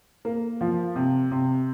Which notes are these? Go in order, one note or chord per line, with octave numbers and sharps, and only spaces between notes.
A#3
F3
C3
C3